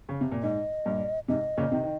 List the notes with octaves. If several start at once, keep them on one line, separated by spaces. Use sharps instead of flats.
C#3
C3
A#2
G#2 D#5
G2 A#2
G#2 C3 D#5
A#2 C#3
C3 D#3
D#3